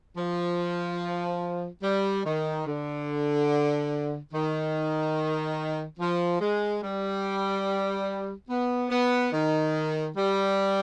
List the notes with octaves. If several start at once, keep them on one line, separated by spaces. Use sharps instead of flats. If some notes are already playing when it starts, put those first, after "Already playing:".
F3
G3
D#3
D3
D#3
F3
G#3
G3
B3
B3
D#3
G3